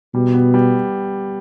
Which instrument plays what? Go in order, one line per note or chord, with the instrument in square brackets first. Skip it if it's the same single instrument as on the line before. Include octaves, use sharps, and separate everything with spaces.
[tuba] B2 [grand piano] G3
[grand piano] B3
G3